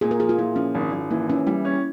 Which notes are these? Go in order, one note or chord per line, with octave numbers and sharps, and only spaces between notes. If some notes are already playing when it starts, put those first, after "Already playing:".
A#2 G#4
A#4
F3 G#4
F4
A#2 E4
F3 C#4
G#1
G#1
E3 A#3
E3 C#4
G3 E4
C#4